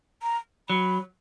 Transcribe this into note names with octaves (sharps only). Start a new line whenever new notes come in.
A#5
F#3 B5